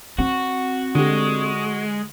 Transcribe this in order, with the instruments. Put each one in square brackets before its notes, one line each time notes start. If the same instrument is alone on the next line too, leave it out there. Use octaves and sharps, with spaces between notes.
[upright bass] C4 [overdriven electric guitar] F#4
[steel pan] D3 G4 [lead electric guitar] G#3